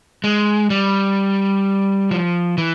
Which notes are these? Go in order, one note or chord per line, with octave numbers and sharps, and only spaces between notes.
G#3
G3
F3
E3